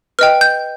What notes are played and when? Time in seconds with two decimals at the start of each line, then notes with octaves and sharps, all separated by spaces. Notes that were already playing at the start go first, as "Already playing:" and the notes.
0.19 B4 D#5 G5 F6
0.41 G6